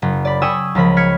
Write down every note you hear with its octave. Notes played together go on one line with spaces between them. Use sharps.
F#1
D5 B5
G5 G#5 B5 C#6 D#6 E6
C#2 F3 A#4 B5
F6 G#6 B6 C#7